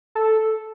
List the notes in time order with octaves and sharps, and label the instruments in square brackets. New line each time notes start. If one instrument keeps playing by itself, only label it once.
[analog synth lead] A4